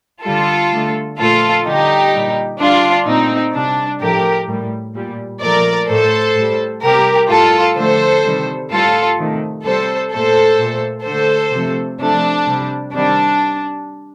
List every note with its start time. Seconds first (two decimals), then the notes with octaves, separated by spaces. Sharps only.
0.24 D3 G3 F4 A4
0.73 D3 A3
1.19 A#2 F3 A3 F4 A4
1.66 D3 G3 D#4 G4
2.13 A#2 G3
2.60 D3 G3 D4 F4
3.06 A#2 A3 C4 D#4
3.54 C3 G3 D4
4.01 A2 F3 A3 G4 A#4
4.48 A2 G3
4.95 A#2 G3
5.42 A#2 F3 A3 A#4 D5
5.88 A2 A3 A4 C5
6.35 A2 G3
6.83 C3 G3 G4 A#4
7.29 A2 G3 F4 A4
7.77 D3 F3 A3 A4 C5
8.24 C3 D#3 G3
8.70 A2 G3 F4 A4
9.18 C3 D#3 A3
9.65 C3 G3 A4 C5
10.12 A#2 A3 A4 C5
10.59 A#2 A3
11.05 D3 A3 A4 C5
11.53 C3 F3 A3
12.00 C3 F3 A3 D4
12.46 C3 G3
12.94 C3 D#3 G3 D4